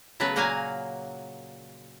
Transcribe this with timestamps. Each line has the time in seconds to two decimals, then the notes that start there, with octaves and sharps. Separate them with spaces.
0.20 C#3 F#3 A3 B3 F#4 B4
0.36 A#2 F#3 A#3 F#4 F5 G#5